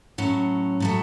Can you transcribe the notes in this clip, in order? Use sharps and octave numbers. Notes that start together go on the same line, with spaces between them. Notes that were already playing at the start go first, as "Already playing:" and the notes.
A2 F#3 C#4
A2 F#3 A3